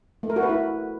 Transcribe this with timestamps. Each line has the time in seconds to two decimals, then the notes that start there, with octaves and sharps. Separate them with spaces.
0.23 A3
0.30 A#4
0.36 F#4
0.43 B4
0.49 E4